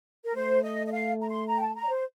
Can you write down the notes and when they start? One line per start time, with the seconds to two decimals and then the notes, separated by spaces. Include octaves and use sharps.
0.25 A#4
0.35 A3 C5
0.63 D#5
0.87 D#5
0.92 F5
1.21 A#5
1.28 C6
1.47 A#5
1.56 G5
1.61 A5
1.75 A#5
1.83 D5
1.89 C5